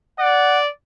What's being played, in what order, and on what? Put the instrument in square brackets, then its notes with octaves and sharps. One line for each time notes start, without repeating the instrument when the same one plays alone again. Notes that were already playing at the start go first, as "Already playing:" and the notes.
[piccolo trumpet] D5 [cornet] F#5